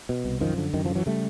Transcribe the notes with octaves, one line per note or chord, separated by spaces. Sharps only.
B2
C2
F#2 D#3 F3
D3
F#2 D#3
D#3 F3
D3
E3 F#3
C#3 G3 A3